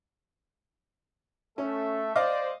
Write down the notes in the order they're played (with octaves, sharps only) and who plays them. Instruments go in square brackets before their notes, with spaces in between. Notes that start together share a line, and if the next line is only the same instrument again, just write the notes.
[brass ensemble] A3 A4 E5 [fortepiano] C#4
[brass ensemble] C5 D5 [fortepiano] D#5 F5 D6